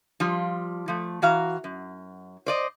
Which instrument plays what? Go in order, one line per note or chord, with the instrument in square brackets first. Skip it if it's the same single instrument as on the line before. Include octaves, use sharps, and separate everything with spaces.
[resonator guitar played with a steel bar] F3 G3 F4
F3 A3
E3 F#4 F5 A#5
F#2
C5 D5 D#5